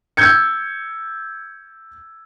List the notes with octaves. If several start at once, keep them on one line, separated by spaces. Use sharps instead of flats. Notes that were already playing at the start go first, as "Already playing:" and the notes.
E6 G6 G#6 C#7